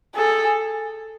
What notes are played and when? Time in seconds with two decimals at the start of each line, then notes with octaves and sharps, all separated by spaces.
0.16 G#4 A4